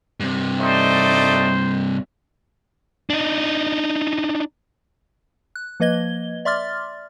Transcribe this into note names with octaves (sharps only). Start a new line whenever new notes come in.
G2 C3
A3 D#4 C5 D5
D4 D#4
F#6
F3 A#3 B4 D#5 G#6 G7
D5 E5 C6 D6 F6 A6